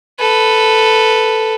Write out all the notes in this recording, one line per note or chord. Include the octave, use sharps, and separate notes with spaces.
A4 B4